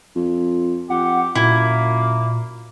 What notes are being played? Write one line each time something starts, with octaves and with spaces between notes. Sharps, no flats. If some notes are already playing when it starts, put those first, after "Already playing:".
F2
F2 G4 F#5
F#2 A#2 A#3 E4